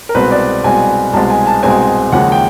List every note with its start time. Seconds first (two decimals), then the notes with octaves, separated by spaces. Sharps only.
0.09 A#4
0.15 C2 B2 G#3 C4 B4
0.31 D5
0.64 C2 B2 G#3 C4 G#5
1.14 C2 B2 G#3 C4 A5
1.30 G#5
1.47 A5
1.63 C2 B2 G#3 C4 G#5
2.12 D#2 C#3 F3 G#3 F#5
2.32 G5